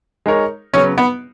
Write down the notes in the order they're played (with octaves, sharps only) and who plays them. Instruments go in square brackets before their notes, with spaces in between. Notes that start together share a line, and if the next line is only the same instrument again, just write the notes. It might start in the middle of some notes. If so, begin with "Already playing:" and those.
[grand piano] G#3 D#4 A#4 C#5
[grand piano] C#3 F#3 B3 [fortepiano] C#4
[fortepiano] B3